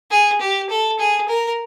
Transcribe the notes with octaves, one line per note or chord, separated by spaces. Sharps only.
G#4
G4
A4
G#4
A#4